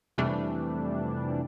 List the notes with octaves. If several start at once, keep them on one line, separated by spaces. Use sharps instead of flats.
F2 C3 E3 G3 A3 D4